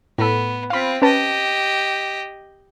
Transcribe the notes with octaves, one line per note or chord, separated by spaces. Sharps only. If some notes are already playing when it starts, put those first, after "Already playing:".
A2 B3 A4
C4 F4 F5 B5
C#4 G4 B4 D#5 A5